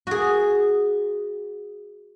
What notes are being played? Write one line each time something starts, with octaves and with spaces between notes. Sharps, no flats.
F#4 G#4